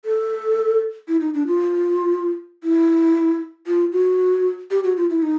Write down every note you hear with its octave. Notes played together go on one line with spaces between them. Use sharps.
A4
E4
D#4
D4
F4
E4
F4
F#4
G4
F#4
F4
E4
D#4